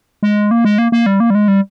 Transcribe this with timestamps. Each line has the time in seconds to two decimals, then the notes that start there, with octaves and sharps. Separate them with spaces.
0.23 G#3
0.51 A#3
0.65 G#3
0.78 A#3
0.92 A#3
1.06 G3
1.20 A#3
1.30 G3
1.35 G#3
1.48 G3